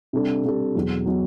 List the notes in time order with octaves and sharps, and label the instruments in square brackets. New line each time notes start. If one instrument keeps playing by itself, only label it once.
[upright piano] C3 G3 D4 A4
C3 G3 D4 A4
E2 B2 F#3
B2 F#3